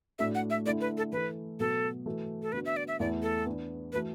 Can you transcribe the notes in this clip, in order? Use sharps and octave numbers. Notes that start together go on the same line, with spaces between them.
A2 A3 D4 F#4 A4 E5
F#5
E5
D3 A3 E4 A4 D5
B4
A4
E3 A3 E4 A4 B4
B2 F#3 A3 A4
E3 A3 F#4 A4
A4
D3 B3 F#4 B4
E5
D5
E5
E2 E3 A3 E4 D5
A4
E3 B3 D4
E3 A3 F#4 B4